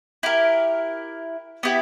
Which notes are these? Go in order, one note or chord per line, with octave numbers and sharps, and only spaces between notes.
E4 G4 A#4
B3 E4 G4